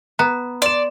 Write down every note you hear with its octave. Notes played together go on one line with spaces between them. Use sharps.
B3 A#5
D5 C6 E7